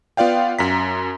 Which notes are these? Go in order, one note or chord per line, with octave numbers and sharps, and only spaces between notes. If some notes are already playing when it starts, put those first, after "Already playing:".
B3 F4 D5 F5 G5
F#2 A#5 B6